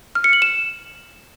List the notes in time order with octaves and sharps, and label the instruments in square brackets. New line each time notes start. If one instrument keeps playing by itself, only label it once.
[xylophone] F6
C#7
F#7
E7